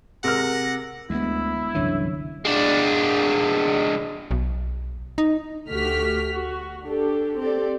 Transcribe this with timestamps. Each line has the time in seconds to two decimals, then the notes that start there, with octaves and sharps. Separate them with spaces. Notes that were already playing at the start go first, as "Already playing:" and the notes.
0.24 C3 G#3 A#4 F#5 F6 A#6
1.10 D2 G#3 B3 E4
1.75 C2 F#2 D3 E3 C#5 E5
2.45 G#3 D4
4.31 B1
5.18 D#4
5.70 D2 A3 F#4 G4 F6 B6
6.31 F#4
6.86 D4 G4 A4
7.39 C4 G4 A4 D5